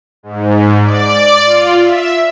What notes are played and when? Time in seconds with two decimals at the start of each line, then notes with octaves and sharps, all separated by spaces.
0.23 G#2
0.83 D5
1.45 F4
1.83 E5